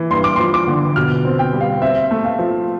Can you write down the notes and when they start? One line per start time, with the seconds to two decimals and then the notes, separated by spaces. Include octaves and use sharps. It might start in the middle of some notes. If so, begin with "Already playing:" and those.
Already playing: E3
0.11 G2 C6
0.24 D6
0.36 F3 C6
0.54 D6
0.68 D3
0.96 B2 F6
1.25 C4
1.39 G5
1.53 G3
1.61 F5
1.82 C4 E5
2.11 A3
2.25 F5
2.39 F3